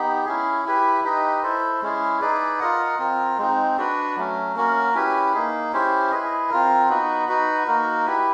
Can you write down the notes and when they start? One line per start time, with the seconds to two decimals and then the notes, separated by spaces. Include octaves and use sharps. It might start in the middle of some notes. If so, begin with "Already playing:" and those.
Already playing: B3 D#4 G4
0.26 C#4 E4 G#4
0.65 E4 G4 B4
1.04 D#4 G4 B4 D#5
1.43 E4 A4 C5
1.81 G#3 C#4 E4 G#4
2.21 D#4 G#4 B4 D5
2.60 F4 A#4 D#5 F#5
2.99 C4 F4 A#4
3.38 G#3 C4 D#4
3.77 D4 F#4 B4
4.16 F#3 A3 C#4
4.55 A#3 C#4 F#4 A#4
4.94 C#4 E4 G4 B4
5.33 A#3 D#4 G#4
5.73 C#4 E4 G4 C5
6.11 E4 G#4 B4 D#5
6.50 C4 F4 A#4
6.89 B3 D#4 F#4 B4
7.28 D#4 F#4 B4
7.67 A#3 D#4 F#4 A#4
8.06 E4 G4 B4